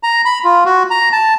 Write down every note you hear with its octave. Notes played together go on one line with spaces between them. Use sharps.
A#5
B5
F4
F#4
A#5
A5